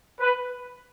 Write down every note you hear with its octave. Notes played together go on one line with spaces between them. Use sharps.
B4